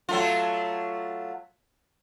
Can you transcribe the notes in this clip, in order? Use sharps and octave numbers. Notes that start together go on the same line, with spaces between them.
F#3 A3 F4